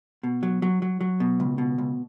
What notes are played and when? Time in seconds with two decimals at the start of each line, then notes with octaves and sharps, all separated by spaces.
0.23 B2
0.43 F#3
0.62 F#3
0.82 F#3
1.01 F#3
1.20 B2
1.40 C#2
1.58 B2
1.78 C#2